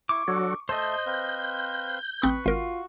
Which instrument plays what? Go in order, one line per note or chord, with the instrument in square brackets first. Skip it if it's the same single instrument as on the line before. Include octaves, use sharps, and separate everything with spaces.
[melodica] E4 [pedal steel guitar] C#6 D6
[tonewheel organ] F#3 F#4 [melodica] D4 A4 [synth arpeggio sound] G#6
[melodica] A3 E5 A5 [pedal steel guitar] C5 D#5 [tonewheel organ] G6
[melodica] C4 B4 F5
[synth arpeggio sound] A1 C4 D#6 [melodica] B4 B5 C#6
[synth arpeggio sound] G#1 A#4 F6 [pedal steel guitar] F4 [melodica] F#4